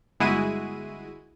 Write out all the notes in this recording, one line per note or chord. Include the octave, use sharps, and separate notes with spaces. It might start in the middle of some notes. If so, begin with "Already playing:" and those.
G1 G#3 E4 F#4 G#4 D#7